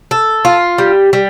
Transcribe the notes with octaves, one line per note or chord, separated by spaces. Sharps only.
A4
F4
G3
G3